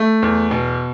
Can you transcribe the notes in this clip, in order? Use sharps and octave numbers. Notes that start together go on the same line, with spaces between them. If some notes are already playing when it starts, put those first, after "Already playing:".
Already playing: A3
E2
B2